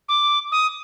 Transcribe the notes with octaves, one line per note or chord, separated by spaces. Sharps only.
D6
D#6